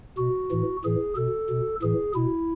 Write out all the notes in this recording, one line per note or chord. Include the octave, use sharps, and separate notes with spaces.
B2 F#4
A2 E3
A2 E3 G#4
B2 A4
B2
A2 E3 G#4
B2 E4